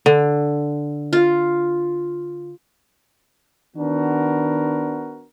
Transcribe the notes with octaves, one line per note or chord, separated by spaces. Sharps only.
D3
F4
D#3 B3 D4 F#4 A#4